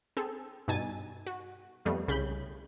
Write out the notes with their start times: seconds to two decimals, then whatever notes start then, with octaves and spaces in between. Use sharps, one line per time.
0.17 C4 G#4 A4
0.68 G2 B2 D#4 G#5 A6 D#7
1.27 F#4
1.85 F2 G3 A3 B3
2.08 C2 C#3 B5 G6